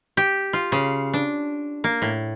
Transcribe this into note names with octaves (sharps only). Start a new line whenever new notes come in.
G4
F4
C#3
D4
A#3
A2